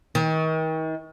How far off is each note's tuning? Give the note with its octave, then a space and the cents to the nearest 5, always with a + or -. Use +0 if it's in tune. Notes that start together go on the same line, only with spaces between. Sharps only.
D#3 +40